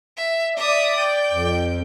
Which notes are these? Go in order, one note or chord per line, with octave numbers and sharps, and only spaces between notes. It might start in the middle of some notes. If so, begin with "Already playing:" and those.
E5
D5 E5 D#6
G5
F2